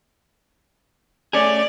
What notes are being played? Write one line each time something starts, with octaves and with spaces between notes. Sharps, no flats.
A3 C#4 G#4 D5